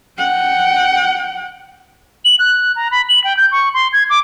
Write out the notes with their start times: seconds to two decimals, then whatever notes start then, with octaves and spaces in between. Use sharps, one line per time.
0.18 F#5 G5
2.25 F#7
2.39 F#6
2.76 A#5
2.91 B5
3.09 F#7
3.24 G5
3.37 G6
3.52 C#6
3.74 C6
3.93 G#6
4.10 D6